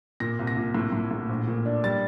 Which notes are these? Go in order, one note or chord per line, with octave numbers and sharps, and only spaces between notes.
A#2 A#6
C2
A#6
A#2
A2
A2
A2
A#1
A#2
D4
G3 A6